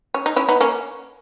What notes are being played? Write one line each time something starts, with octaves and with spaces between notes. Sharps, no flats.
C#4
D#4
C#4 E4
B3 D#4
A#3 C#4